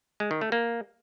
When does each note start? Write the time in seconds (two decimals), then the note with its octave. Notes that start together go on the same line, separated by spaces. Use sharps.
0.20 G#3
0.31 D#3
0.41 A3
0.52 A#3